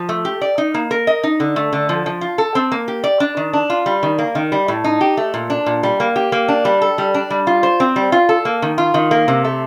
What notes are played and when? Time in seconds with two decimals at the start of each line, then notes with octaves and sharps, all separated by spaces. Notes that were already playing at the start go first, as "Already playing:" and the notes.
Already playing: F3
0.09 A3
0.25 G4
0.41 D5
0.58 D#4
0.74 A#3
0.91 A#4
1.07 D#5
1.24 D#4
1.40 D3
1.56 A3
1.73 D3
1.89 F3
2.06 F3
2.21 F4
2.38 A4
2.55 C4
2.72 A#3
2.88 G4
3.04 D5
3.20 D4
3.37 D#3
3.53 D4
3.70 F4
3.86 G3
4.03 D#3
4.18 A#3
4.35 D#3
4.52 G3
4.68 A2
4.84 D#4
5.01 G4
5.17 A3
5.34 A#2
5.50 D4
5.66 A#2
5.83 G3
6.00 A#3
6.16 G4
6.32 A#3
6.48 D4
6.65 G3
6.82 A4
6.98 G3
7.14 D4
7.30 G3
7.47 F4
7.63 C5
7.80 C4
7.96 G3
8.12 F4
8.29 A4
8.45 A#3
8.62 D#3
8.78 F4
8.94 D#3
9.11 A#3
9.28 C3
9.45 A3